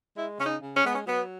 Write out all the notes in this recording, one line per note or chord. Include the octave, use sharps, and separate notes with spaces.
G#3 E4
C#3 C#4
D#4
C#3
C#4
G#3 B3
C#4
F#3 B3